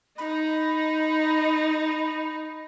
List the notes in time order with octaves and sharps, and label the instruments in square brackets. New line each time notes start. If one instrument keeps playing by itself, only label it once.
[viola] D#4 [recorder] B5